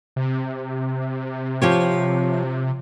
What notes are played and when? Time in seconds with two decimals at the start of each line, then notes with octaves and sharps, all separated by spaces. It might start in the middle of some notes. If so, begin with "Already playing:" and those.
0.16 C3
1.62 F3 G4 C#5